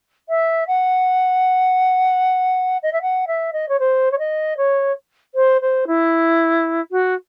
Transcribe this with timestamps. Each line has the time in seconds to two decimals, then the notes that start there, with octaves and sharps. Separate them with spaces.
0.29 E5
0.68 F#5
2.83 D#5
2.93 E5
3.02 F#5
3.27 E5
3.53 D#5
3.69 C#5
3.80 C5
4.11 C#5
4.19 D#5
4.57 C#5
5.35 C5
5.61 C5
5.87 E4
6.91 F#4